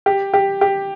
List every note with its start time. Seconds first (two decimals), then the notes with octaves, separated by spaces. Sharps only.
0.06 G4
0.34 G4
0.61 G4